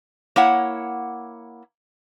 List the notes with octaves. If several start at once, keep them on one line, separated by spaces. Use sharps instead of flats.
A#3 E4 C#5 F#5